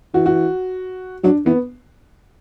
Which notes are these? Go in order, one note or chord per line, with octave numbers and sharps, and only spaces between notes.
E3 F#4
F#4
F#3 D4
E3 B3